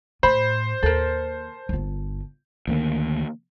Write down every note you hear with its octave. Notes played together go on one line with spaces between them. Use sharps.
A2 C5 B5
D#2 A4 A#4
G1 F4
D2 D#3 A#3